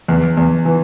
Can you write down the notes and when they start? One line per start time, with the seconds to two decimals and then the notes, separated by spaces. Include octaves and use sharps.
0.08 E2
0.37 E2
0.65 E3